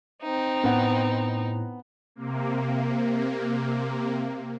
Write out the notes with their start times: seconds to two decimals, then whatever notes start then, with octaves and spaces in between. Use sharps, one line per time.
0.22 C4 D#4
0.64 A2 B3 F#5
2.15 C3 A#3